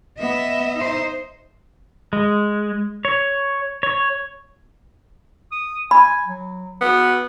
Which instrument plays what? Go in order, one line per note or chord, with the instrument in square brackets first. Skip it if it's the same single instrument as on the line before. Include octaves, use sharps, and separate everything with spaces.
[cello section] B3 [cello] D#5 E5
[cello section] D#4 C5
[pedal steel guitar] G#3
C#5
C#5
[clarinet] D#6
[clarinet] G#5 [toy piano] B5
[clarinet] F#3
[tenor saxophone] B3 [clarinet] F#4